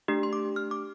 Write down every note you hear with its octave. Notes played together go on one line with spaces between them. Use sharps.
A3 D4 G4
C6
D6
F6
D6